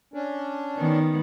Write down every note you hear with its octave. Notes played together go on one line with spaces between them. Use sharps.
C#4 D4
D#3 B3